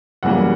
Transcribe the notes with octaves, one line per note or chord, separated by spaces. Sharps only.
F#1 F#2 E3 G3 A#3 F#5